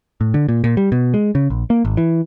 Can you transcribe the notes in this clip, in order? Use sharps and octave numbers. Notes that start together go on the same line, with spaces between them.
A2
D3
A#2
A#2
G3
B2
G#3
C#3
A#1
A#3
G#1
E3